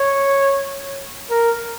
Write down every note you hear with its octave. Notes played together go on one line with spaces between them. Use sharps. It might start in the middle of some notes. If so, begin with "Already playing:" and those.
Already playing: C#5
A#4